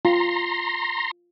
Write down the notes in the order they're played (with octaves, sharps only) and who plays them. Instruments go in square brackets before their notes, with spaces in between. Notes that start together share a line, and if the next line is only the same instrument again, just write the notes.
[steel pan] F4 [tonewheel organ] A#5 C6